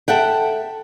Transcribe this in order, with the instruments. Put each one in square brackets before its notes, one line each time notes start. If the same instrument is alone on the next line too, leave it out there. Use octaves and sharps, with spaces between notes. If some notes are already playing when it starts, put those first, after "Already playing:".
[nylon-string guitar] A4 E5 F#5 G5